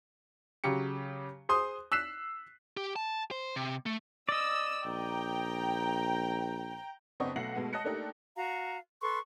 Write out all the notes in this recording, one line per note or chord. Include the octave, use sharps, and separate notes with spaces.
C#3 F#3 G4 C#7
G#4 C5 C6 D#6
E6 F#6 B6 C7 E7
G4
A5
C5
C3
A3
D5 D#5 E6
A#1 G5 A#5
F#1 B3 C4 D4 D#5 C#6
B1 A3 F#5 A#6 C7 F#7
B2 G#3 A3 B3
D#5 A5 F#6 A#6 C#7
A3 A#3 D4 D#4 G4 A4
F#4 F5 A#5
A4 B4 C6 C#6